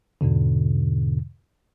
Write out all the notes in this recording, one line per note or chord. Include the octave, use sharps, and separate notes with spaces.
E2 G#2 B2 D3